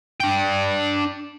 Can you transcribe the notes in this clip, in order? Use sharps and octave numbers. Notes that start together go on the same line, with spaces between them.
D4 G5